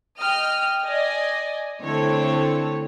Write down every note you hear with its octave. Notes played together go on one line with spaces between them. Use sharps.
D#5 G5 F6
D5 D#5 G#5
D3 A3 C4 E4 A4 C#5